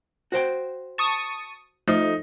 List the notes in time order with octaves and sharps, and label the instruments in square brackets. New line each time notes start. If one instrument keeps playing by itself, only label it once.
[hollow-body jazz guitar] F#4 C5 G5
[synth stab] A5 C#6 D#6
[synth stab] F3 A3 [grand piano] D#4